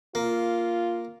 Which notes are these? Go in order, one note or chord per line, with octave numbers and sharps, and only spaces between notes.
A#3 F4